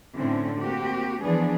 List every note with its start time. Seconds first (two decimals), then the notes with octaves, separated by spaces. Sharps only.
0.17 A2 D3 C4 C#4 E4
0.60 A#3 C4 F#4 G4
1.22 E3 F3 B3 D4 G#4 D5